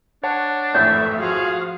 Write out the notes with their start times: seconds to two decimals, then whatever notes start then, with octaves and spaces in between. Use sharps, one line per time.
0.23 D4 C#5 F#5 A5
0.75 G#1 F2 A2 E3 A3 C#5 E5
1.19 F3 F#4 G#4 F5